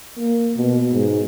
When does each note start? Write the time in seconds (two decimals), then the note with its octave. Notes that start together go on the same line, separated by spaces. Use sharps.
0.17 A#3
0.57 B2
0.92 G#2